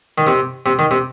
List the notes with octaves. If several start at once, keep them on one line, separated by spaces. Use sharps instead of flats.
D#3
C3
C3
D#3
C3